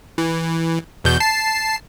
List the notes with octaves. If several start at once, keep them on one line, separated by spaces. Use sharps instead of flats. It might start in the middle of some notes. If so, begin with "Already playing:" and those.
E3
E2 B2 G6
A5 C7